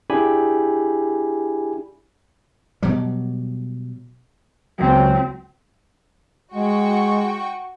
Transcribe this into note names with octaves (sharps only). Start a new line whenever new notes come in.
D4 E4 G4 G#4 G#5 B5
B2 F#3 G3
C#2 F#3 C4
G#3 F#4 G5 C#6